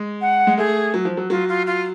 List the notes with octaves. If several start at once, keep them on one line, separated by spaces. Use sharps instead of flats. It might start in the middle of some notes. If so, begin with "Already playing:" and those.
Already playing: G#3
F#5
G#3
A3 G#4
F#3
F3
F#3
F#3 F4
F4
F4